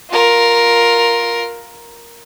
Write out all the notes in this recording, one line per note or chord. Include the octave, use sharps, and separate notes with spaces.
F4 A#4